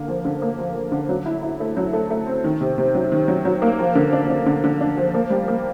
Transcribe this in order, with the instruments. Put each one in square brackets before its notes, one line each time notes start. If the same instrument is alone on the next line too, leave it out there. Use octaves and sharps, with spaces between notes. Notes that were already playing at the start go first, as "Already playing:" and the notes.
Already playing: [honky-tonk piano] D3 A#3
F3
D3
A#3
F3
F3
D3
F#3
E4
E4
A3
F#3
A3
A3
C4
D#3
C3
C3
F#3
D#3
F#3
F#3
A#3
F3
D3
D4
D4
D3
D3
D4
F3
A#3
G3
A#3